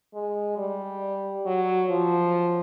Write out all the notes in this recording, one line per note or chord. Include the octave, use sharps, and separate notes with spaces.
G#3
G3
F#3
F3